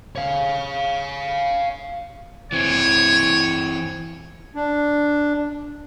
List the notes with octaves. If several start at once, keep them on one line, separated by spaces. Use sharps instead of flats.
C#5 F5
E3 C4 C#5
D4